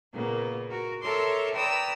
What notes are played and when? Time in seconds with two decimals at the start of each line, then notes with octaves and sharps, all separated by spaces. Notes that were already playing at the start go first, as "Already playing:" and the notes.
0.13 A#2 C#3 A#3 B3
0.69 F#4 A#4
1.02 A4 A#4 C#5 E5 C6 D6
1.53 B4 D5 G5 A#5 D#6 E6